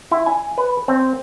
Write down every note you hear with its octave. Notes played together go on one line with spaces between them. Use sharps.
E4
G#5
B4
C4